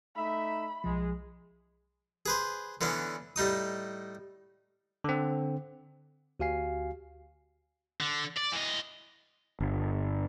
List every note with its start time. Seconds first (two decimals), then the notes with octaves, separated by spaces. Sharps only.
0.16 A3 D#4 E5 B5
0.84 B1 F3 G#3
2.26 G#4 B4 C5
2.81 D3 E3 B3 C#4 D4
3.36 A2 G3 D#4 D#6
5.04 D3 C4
6.40 D2 F#4 G4 F5 G#5 C7
8.01 D3
8.37 D5
8.52 E3 D#5
9.60 G1